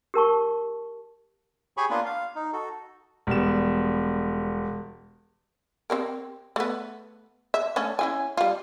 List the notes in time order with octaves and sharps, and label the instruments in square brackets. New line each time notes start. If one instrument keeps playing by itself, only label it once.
[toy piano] G4 A#4 A5 C#6
[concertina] G4 G#4 C#5 G#5 B5 C#6
A#3 B3 D4 F4 B4
F5
D#4
F#4 A4
[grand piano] E1 G3 B3 E7
[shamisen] C4 G4 A#4
A3 B3
E5
A3 C#4 D4
C#4 E4 G#5
G3 F4